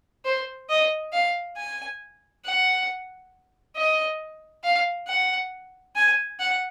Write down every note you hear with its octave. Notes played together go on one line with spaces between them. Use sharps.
C5
D#5
F5
G#5
F#5
D#5
F5
F#5
G#5
F#5